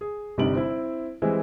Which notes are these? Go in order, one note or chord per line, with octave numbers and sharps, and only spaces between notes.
G#4
G1 C3 G3 D#4 D7 F#7
C4 E4
E3 G3 G#3 C4 E4